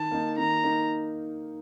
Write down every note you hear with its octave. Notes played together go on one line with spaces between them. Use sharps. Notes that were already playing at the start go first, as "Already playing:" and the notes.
Already playing: D#3 A5
A#3 D#4
D#3 A#5
A#3 D#4